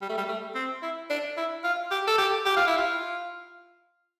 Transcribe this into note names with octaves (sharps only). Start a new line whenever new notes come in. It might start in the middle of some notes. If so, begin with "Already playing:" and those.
G3
A3
G3
A3
C4
E4
D4
E4
F4
G4
A4
G4
G4
F4
E4
F4